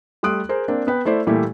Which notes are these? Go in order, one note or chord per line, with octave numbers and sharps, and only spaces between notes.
G3 A3 C6 D#6 F#6 D7
G#4 A#4 C5
A#3 C4 D4
B3 B4 G5
A3 E4 C5 D5
A#2 E3 G3 A3 E4 G4